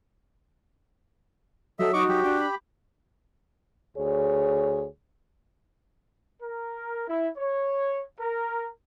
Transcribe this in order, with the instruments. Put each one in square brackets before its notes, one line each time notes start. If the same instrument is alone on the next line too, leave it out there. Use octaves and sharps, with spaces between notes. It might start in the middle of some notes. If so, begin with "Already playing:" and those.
[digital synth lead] F#3 [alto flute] A4 [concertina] D#5 E5
[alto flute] D#4 [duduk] F#4 [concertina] D#5 C#6 D6
[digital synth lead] F#3 [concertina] G4
[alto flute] D4 [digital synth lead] G5
[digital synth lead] B5
[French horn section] D2 G#4 C#5
[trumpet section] A#4
E4
C#5
A#4